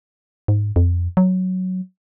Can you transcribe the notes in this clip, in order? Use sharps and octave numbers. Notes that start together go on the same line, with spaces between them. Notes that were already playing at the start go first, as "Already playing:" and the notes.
G#2
F2
F#3